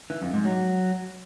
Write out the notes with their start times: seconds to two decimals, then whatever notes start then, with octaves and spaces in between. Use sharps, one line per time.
0.10 E3
0.22 F2
0.33 G#2
0.45 F#3